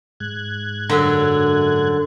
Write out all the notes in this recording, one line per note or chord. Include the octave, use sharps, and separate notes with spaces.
G#2 F#6 G#6
F#2 D3